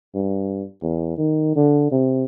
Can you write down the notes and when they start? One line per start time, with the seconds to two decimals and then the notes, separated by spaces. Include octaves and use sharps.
0.15 G2
0.82 E2
1.18 D#3
1.56 D3
1.92 C3